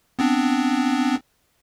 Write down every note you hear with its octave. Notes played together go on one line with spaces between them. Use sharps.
B3 C4 D4